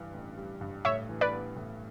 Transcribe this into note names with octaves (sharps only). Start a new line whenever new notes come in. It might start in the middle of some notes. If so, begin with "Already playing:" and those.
Already playing: G2 E3 G3
A1
G3
G2
A2 C#5 E5
E3
B4 D5
B3
A2